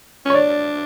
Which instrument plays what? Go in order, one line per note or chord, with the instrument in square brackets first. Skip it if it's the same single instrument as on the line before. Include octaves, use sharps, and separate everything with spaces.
[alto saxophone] C#4
[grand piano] C#5
[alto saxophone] D4 [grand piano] D5